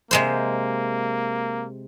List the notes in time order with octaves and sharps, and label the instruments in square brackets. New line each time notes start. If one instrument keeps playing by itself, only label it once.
[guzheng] C3 G#3 C5 [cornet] A#3